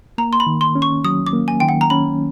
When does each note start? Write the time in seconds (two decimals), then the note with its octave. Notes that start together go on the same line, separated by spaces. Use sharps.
0.18 A#3 A#5
0.33 C6
0.40 B5
0.47 D#3
0.61 C6
0.75 C#4
0.82 C#6
1.05 F#3 D#6
1.27 D6
1.33 A#3
1.48 G#5
1.60 D#3 G5
1.69 F#5
1.81 A#5
1.90 C#4 B5